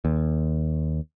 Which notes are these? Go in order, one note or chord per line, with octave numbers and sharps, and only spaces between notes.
D#2